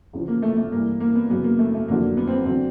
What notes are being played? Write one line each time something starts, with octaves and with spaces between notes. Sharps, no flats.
E2 C#3 F3
A#3
A3
A3
G2 E3 A#3
A#3
B3
F#2 C#3 F#3 B3
A#3
A3
A3
F2 D3 F#3 A#3
B3
C4
B3
D3 F#3 C4